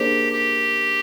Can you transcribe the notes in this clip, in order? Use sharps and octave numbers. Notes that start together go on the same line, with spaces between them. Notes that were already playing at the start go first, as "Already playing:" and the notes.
Already playing: A#3 D4 G4 G#4 C5
G4